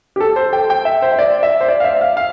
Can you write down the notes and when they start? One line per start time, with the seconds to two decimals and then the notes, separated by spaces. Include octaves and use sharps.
0.16 G4
0.20 A4
0.36 C5
0.53 G5
0.70 G5
0.85 E5
1.02 C5
1.12 E5
1.19 D5
1.43 E5
1.61 C5
1.68 D5
1.80 F5
1.84 E5
2.01 F5
2.17 F5